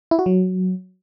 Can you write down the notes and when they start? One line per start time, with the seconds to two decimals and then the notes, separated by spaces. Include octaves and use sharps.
0.11 E4
0.19 F#4
0.26 F#3